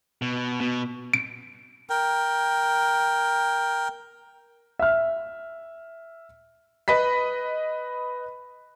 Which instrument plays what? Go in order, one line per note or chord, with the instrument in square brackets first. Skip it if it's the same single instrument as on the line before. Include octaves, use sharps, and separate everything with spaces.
[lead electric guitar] B2
B2
[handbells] D7
[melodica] A#4 G5
[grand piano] E5 F6
B4 D#5 B5 B6